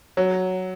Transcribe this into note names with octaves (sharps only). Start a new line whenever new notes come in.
F#3